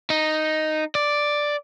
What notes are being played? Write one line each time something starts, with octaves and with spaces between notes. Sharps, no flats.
D#4
D5